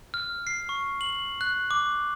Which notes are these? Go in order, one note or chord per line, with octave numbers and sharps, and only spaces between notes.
F6
C7
C#6
F#7
F#6
D6